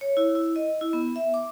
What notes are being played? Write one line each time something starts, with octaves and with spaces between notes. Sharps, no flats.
C#5
E4
E4
D#5
E4
B3
E5
D6